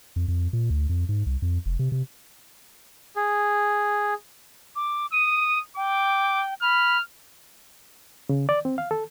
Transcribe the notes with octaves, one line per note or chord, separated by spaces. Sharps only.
F2
F2
A#2
D2
F2
G#2
C2
F2
F1
C3
C3
G#4
D6
D#6 D#7
G5 D6
B5 F6
C#3
D5
C4
F5
A4